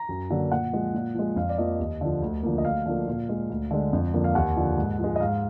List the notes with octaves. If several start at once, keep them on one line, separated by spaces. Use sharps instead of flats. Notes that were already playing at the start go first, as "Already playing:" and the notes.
Already playing: A#5
F#2
D3 F#3 A#3
A#2 F#5
F3 G#3
A#2
F3 G#3
F2 F5
D5
F3 A#3 D#5
D#2
D3 F3
D2
D3 F3 A#3
D#5
D2 F5
D3 F3 A#3
A#2
G#3
D2
D3 G#3
F2
D3 F3 A#3
F5
D#2 F#5
D3 F3
G#2
F3 G#3
D#5
G#2 F5